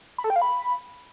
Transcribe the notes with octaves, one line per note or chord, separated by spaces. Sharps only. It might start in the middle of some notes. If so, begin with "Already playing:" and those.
B5
A4
G5
F5
B5